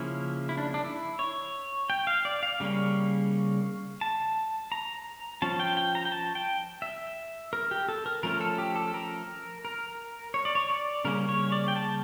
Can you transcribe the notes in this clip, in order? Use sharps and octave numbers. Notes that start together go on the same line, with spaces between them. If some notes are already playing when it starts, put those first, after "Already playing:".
Already playing: C#3 F3 A#3 C#4 E4
E4
D4
D4
E4
C#5
G5
F5
D5
F5
C#3 G3 A#3 C#4
A5
A#5
F3 C#4 A5
G5
G5
A#5
G5
A5
G5
E5
A#4
G4
A4
A#4
F3 A3 C#4 A#4
A4
G4
A4
A#4
A#4
C#5
D5
C#5
D5
C#3 G3 A#3 C#4 A#4
C#5
D5
G5
A5